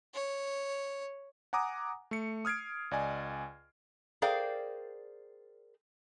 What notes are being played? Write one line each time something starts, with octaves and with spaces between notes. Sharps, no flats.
C#5
F#5 G#5 A#5 D6 D#6
A3 C#7
D#6 F6 G#6 C7 D7
C#2 D5 D#5 G#5
G#4 A#4 C5 D5 F5 G5